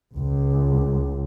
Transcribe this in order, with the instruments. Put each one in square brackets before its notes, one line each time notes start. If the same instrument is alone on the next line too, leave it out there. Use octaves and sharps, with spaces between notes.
[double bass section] C#2